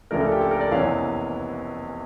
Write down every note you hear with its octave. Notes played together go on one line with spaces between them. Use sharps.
C#2 C#3 F3 A3 D4 A#4
A4
G4
A4
A#4
D5
F1 E2 E3 A#3 C#4 F5